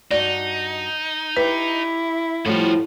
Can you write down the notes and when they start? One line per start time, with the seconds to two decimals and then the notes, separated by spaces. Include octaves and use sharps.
0.11 G2 D#4 F#4 D5
1.37 E4 G4 B4
2.46 A2 F3 G3 F4 F#4